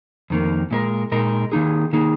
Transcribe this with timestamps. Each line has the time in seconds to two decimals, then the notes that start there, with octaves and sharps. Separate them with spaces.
0.30 F2 D#3 A#3
0.71 A#2 G#3 D#4 A#4
1.12 A#2 G#3 D#4 A#4
1.52 D#3 A#3 D#4 G#4
1.93 D#3 A#3 D#4 G#4